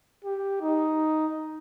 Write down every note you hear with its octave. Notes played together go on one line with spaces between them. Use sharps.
G4
D#4